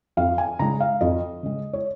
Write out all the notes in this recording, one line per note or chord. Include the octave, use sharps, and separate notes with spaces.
F2 F5
G#5
C#3 G#3 A#5
F5
F2 D#5
C#3 G#3
C#5